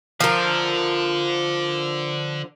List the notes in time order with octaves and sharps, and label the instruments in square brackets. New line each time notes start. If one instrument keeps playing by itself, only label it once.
[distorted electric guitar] D3 [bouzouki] F3 A#4